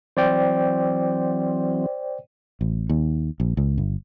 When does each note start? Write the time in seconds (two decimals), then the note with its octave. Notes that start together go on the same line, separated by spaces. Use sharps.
0.17 E3 F#3 C4 C5 D5 G5
2.61 A1
2.89 D#2
3.40 A#1
3.57 C#2
3.78 G1